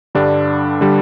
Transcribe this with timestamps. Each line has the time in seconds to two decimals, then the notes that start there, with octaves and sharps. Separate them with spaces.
0.15 G2 D3 G3 D4
0.81 D3 G3